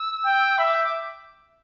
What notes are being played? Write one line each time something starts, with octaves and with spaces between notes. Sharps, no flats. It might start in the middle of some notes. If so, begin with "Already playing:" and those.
Already playing: E6
G5
E5 B5
D6
G6
D6